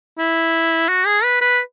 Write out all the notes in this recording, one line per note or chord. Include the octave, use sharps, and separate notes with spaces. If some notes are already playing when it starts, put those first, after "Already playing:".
E4
F#4
G#4
B4
B4